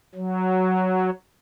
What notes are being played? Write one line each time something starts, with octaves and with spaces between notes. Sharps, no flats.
F#3